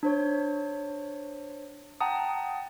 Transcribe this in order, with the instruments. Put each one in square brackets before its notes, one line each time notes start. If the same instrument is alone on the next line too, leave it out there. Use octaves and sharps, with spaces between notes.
[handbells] D4 C5 C#5
F#5 G5 A5 A#5 D#6